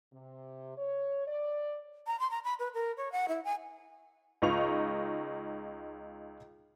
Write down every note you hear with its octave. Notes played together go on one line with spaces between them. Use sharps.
C3
C#5
D5
A#5
C6
A#5
B5
B4
A#4
C#5
F#5
E4
G#5
C#2 D#4 F4 C#6 F7